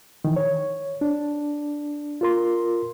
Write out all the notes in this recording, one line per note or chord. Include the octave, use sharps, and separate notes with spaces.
D#3 E3
C#5
D4
F4 A#4 C6